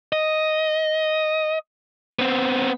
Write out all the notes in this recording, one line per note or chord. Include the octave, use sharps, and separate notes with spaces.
D#5
B3 C4